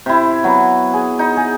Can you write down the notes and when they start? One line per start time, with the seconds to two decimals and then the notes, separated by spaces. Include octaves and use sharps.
0.06 C3 E4
0.44 F#3 B3
0.93 G#4
1.19 D#4
1.37 G#4